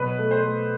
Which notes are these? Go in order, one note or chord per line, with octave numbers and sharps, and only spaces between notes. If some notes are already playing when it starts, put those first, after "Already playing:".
Already playing: B2 F#3 B4
A3
C5
A3